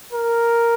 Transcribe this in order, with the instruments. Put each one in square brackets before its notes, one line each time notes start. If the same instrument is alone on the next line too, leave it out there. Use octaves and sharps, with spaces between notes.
[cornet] A#4